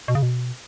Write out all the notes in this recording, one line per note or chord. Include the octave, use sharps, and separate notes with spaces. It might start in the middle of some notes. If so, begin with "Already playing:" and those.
B2
C#3
B2